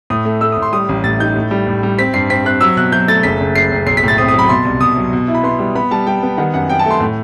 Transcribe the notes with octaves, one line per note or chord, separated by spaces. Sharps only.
A2 D#6
A3
A3 E6
D#6
A2
C6
G3 D#6
A1
A2 A6
D#4 G6
A2
G3
A2
G3
C4 B6
G2 C7
C4 B6
C4 F#6
F#3 E6
B2 F#6
F#3 G6
A3 A6
F#1 B6
F#1
F#1 C7
F#1
B1 C7
B6
A2 A6
C4 D#6
D#6
F#3
B5
B2 C6
C2
B2 D#6
F#3
B2
E4
B5
B3 C6
G3
B3 B5
G3 A5
G3 G5
B3
D#3 F#5
F#2 F#5
F#2 G5
A5
A3
C6
A2